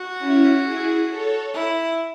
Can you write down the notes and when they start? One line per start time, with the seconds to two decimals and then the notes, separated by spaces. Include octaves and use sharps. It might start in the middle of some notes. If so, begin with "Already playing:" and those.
Already playing: F#4
0.19 C#4 E4
0.64 E4 G#4
1.09 A4 C#5
1.54 E4